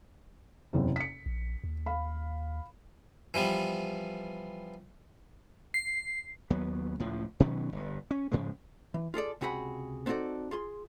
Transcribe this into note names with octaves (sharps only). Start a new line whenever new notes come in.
F#1 E2 C3
B6 C#7
A#1
D#2
F5 B5
E3 F3 G3 B3
C7
D#2 F#3 B3
C#2 A2 F3
B2 D#3 F#3 C#4
G1 G2
C#4
G#2 C#3 F3 G#3
E3
F4 G#4 A4 D5
C#2 C3 F#4 G#4 F#5 B5
B3 C4 D#4 F#4 A4 D5
F4 G#4 C6